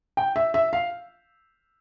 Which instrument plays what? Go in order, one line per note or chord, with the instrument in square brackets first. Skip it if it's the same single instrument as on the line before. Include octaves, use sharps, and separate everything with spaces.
[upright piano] G5
E5
E5
F5